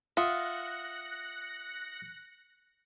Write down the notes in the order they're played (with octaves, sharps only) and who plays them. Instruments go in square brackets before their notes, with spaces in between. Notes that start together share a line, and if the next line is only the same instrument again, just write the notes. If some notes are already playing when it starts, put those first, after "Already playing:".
[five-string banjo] F4 [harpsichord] D#5 E5 F#5 [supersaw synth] F#6 A#6 C#7